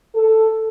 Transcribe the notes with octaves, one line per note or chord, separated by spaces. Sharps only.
A4